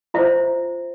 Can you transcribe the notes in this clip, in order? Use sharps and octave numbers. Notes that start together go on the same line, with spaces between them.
F4 C5 E5